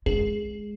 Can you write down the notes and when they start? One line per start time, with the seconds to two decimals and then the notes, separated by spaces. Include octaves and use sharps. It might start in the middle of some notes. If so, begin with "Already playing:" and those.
0.06 G#3 G#4